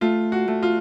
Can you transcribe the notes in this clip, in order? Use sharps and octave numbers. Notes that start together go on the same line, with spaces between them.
A3 F4
F#4
A3
F4